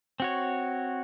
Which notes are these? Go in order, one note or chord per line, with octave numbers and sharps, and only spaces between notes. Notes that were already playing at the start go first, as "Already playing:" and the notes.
C4 F#4 C#5